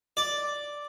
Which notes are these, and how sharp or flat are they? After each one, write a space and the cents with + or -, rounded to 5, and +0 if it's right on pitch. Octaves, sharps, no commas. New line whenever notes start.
D5 +0